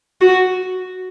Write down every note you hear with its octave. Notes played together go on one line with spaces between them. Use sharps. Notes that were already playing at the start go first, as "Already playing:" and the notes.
F#4